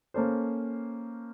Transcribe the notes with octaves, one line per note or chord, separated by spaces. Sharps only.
A#3 C#4 A4 C5